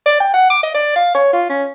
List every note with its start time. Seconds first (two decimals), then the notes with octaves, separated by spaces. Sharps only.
0.06 D5
0.20 G5
0.34 F#5
0.50 D6
0.63 D#5
0.74 D5
0.96 F5
1.15 C#5
1.33 F4
1.49 C#4